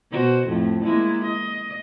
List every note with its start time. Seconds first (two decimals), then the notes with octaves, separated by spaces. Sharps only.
0.11 B2 F#4 C5
0.47 F2 A2 A3
0.83 G#3 A#3 E4
1.23 D#5